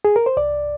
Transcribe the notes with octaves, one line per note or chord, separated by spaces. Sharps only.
G#4
A#4
C5
C2 D5